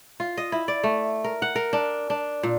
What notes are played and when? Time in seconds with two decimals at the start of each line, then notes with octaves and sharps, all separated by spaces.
0.20 F4
0.38 D#5
0.52 E4
0.68 D5
0.84 A3
1.24 A#4
1.42 F#5
1.56 A#4
1.73 D4
2.10 D4
2.43 A#2